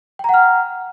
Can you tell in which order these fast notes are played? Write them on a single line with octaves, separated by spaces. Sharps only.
G5 A#5 F#5 F6